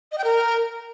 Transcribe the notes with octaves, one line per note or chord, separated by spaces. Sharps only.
D#5
G5
A#4